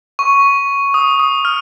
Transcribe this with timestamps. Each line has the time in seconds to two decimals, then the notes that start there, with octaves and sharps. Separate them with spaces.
0.19 C#6
0.94 D#6
1.20 D#6
1.45 F6